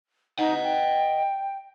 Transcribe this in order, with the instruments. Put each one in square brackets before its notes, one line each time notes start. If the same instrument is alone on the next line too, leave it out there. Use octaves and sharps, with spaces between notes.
[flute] D#4 [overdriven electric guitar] D#5 F#5
[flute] G5